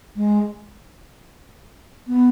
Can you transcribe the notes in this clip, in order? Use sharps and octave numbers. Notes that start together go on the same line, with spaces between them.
G#3
B3